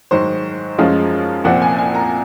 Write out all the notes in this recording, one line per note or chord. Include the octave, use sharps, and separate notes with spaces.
G#2 D#3 F#3 C5
F#2 F3 G#3 C#4 F4
C2 A#2 F3 C4 F#5
G#5
G#5
A#5